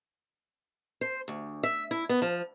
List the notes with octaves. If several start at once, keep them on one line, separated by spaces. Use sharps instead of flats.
C5
D2
E5
E4
B3
F3